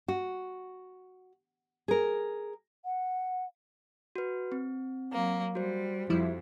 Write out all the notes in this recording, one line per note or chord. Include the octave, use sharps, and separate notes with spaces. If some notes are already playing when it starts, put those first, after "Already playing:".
F#4
G#4 A#4
F#5
F#4 B4
C4
F#3 A#3
G3 F#4 C5
F2 F3 G3 E4